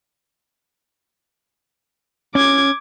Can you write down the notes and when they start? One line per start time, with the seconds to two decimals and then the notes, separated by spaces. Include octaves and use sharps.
2.35 C#4 D6 G#6